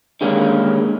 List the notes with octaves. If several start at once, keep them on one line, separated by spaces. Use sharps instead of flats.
D3 D#3 G3 G#3 A#3 C#4